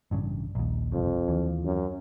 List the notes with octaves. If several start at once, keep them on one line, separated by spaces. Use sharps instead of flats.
A1 G2 C#3
A#1 D#2
F#1 C2 F2
D#2 E3
F#2